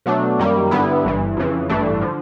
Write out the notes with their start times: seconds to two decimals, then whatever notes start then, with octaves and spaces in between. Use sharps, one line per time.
0.06 B2 F#3 A3 D4
0.39 F#2 D#3 G3 A#3
0.71 G2 D3 G3 B3 E4
1.05 G1 G2 E3
1.37 F2 C#3 E3
1.69 A1 G2 E3 A3 D4
2.01 D3 F3